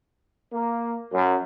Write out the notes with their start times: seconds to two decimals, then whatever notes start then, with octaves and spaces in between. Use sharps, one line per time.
0.53 A#3
1.12 F#2